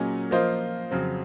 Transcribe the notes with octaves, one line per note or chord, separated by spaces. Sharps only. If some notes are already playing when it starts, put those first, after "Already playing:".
Already playing: A#2 F#3 C#4 G#4 D#5
F3 A#3 F4 C5 D#5
F2 C#3 F#3 C4